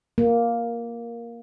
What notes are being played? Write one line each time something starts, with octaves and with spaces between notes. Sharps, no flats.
A#3